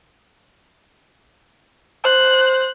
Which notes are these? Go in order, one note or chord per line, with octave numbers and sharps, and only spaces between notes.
C5 F#6